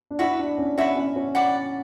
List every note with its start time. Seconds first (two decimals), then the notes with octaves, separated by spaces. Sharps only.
0.11 D4
0.19 E4 F#4 B4 E5 B5
0.39 D4
0.58 C#4
0.77 C#4 F#4 B4 E5 B5
0.96 C#4
1.16 C#4
1.35 D5 F#5 B5